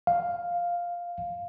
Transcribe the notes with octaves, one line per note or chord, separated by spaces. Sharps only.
F5